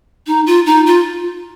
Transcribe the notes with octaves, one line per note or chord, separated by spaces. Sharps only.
D#4
F4
D#4
F4